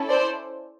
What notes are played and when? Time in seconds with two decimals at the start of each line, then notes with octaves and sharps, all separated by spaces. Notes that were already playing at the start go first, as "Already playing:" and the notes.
Already playing: C#4 E4 A4
0.09 C5 D5